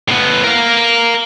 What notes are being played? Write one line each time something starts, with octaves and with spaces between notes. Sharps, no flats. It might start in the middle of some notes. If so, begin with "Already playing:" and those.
A2 B3
A#4 F5